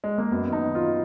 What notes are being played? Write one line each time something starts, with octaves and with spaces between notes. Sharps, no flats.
G#3
A#3
F#2 B3
D#3
D#4
D#3
F4